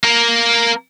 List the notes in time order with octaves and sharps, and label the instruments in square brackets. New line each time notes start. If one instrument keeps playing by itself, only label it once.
[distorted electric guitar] A#3 A#4